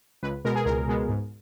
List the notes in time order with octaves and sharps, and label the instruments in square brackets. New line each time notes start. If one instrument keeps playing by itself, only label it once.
[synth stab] C#2 B4
B2 G#3 B3 A#4
G#4
C#2 A#4
B2 G#3 B3
G#2